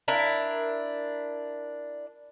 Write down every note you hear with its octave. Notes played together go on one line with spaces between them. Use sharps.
D4 E4 A#4